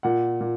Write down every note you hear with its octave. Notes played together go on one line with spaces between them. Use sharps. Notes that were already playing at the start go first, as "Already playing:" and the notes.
A#2 F#5
A#2